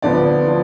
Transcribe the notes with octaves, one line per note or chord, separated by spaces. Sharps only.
D2 D3 F3 B3 D5
F3